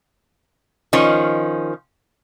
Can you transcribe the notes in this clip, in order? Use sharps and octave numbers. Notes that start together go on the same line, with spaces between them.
D#3 F3 C#4